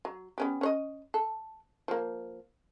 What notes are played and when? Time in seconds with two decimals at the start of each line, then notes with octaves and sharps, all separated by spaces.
0.05 F#3
0.38 B3 C#4 G4
0.61 C#4 C#5 D#5
1.14 A4
1.88 F3 A#3